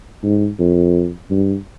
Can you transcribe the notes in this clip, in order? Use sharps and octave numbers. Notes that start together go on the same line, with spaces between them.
G#2
F2
G2